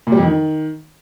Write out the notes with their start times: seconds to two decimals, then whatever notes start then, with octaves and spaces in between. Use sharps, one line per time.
0.07 A#2
0.12 G3
0.17 F2
0.23 D#3